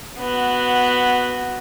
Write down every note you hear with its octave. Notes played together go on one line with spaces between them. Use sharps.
B3 F#4